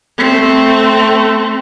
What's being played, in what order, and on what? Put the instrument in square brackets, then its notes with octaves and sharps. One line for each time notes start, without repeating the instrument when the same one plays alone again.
[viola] A3 C4